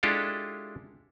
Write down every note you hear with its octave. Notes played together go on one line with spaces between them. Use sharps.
G#3 D4 E4 F4 G4 A4